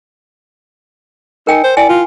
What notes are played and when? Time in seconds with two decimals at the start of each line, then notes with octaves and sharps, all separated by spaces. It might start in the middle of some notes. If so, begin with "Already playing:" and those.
1.47 D#4 A#4 G5 G#5
1.64 C5
1.77 E4 D5 G5 G#5
1.89 F4